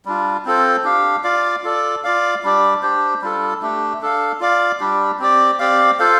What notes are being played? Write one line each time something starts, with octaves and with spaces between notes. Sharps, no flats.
G3 D4 F4
C4 F4 A4 C5
D4 G4 F5
F4 D5 F5
F4 A4 D5
F4 D5 F5
G3 D4 G4 D5
D4 G4 C5
G3 D4 F4 A4
A3 D4 G4
D4 A4 F5
F4 D5 F5
G3 D4 G4
C4 G4 D5
C4 G4 D5 F5
F4 A4 C5 F5